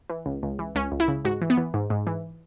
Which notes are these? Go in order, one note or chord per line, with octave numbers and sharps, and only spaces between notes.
E3
C#2
C#2
E3
C#2 C#4
C#2
E4
C#3
G#2 F#4
E3
B3
E3
G#2
G#2
E3